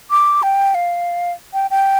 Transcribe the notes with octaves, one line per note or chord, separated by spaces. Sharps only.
D6
G5
F5
G5
G5